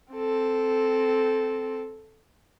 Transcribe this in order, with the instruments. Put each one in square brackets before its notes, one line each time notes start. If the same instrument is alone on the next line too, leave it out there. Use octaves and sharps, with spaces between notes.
[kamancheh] C4 A4